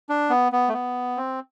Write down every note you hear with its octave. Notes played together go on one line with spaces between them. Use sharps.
D4
B3
B3
A3
B3
C4